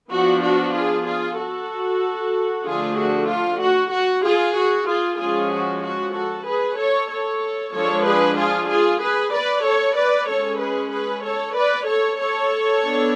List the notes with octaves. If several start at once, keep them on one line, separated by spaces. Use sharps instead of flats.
F3 B3 D4 F#4
F#4
F4 G#4
F4 G#4
F#4 A4
D3 F3 A3 D4 F4 G#4
F#4
F4
F#4
F#4
F4 G#4
F#4
F4 G#4
F3 G#3 C#4 F4 G#4
F#4
F#4
F#4 A4
G#4 B4
A4 C#5
A4 C#5
F3 G#3 D4 A4 C#5
G#4 B4
F4 G#4
F4 G#4
G#4 B4
B4 D5
A4 C#5
B4 D5
G#3 C#4 A4 C#5
G#4 B4
G#4 B4
A4 C#5
B4 D5
A4 C#5
A4 C#5
B3 D4